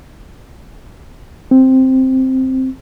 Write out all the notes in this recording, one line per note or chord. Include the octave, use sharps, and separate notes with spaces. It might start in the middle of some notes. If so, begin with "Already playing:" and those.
C4